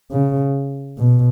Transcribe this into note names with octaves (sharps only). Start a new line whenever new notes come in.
C#3
B2